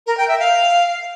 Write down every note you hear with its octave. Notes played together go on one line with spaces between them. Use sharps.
A#4
G5
E5
F5